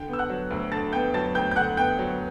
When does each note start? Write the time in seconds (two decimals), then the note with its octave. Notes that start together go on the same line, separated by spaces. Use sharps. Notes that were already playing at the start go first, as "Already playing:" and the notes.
Already playing: D3 G5 G6
0.08 B3
0.13 E6
0.19 F#5 F#6
0.30 F#3
0.51 D2
0.72 D3 A5 A6
0.93 B3 G5 G6
1.14 F#3 A5 A6
1.35 D2 G5 G6
1.51 G6
1.56 D3 F#5 F#6
1.77 B3 G5 G6
1.99 F#3